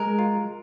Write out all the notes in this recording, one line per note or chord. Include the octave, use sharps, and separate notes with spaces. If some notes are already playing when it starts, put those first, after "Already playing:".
Already playing: G#3 A#4
F4